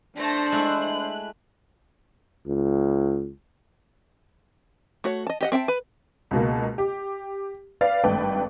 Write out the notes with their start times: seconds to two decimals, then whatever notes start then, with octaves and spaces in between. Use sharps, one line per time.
0.18 A3 D4 C5 A5 A#6
0.52 G#3 A3 E4 F#6
2.47 C#2
5.04 A3 F#4 C#5
5.27 D#5 A5
5.41 G4 D#5 F#5
5.52 C4 E5 G5 A5
5.68 B4
6.31 C#2 B2 A#3
6.78 G4
7.81 B4 D5 F5 A6
8.04 G#1 G2 A3 B4 G5